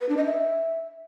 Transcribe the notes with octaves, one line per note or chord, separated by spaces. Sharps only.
B4
D4
D#5
E5